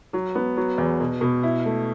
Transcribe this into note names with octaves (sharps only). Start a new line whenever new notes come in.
F#3
B3
F#3
E2
B2
B2
E4
A3